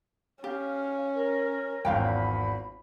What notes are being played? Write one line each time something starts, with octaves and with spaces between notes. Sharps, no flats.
C#4 G4 F5
A#4
G#1 E2 F4 F5 G5 B5